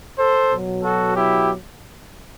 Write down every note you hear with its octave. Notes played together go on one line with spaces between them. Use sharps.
A4 C5
B2 F#3
F#4 A4
E4 G4